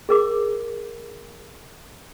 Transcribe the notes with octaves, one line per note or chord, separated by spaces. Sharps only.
G#4 A#4 D6